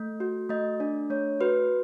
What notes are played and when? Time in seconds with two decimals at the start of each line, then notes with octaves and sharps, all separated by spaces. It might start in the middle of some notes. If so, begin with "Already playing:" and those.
Already playing: A3
0.20 F#4
0.49 A3 D#5
0.80 D4 D5
1.10 A3 C#5
1.40 F#4 B4